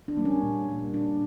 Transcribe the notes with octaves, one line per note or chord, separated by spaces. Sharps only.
D4
G3 A#3
C#4
A#2
G3 A#3
A#2 D4